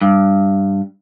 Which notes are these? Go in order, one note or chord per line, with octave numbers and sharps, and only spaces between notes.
G2